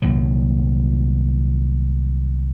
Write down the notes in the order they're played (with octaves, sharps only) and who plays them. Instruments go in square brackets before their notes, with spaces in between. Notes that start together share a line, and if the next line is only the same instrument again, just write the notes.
[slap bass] C2 A#2 D#3 F#3